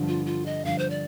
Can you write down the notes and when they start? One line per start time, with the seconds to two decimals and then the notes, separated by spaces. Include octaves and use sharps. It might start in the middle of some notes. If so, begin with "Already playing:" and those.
Already playing: G2 D3 F3
0.08 F4
0.26 F4
0.46 D#5
0.64 G2 D3 F3 F5
0.79 C5
0.90 D5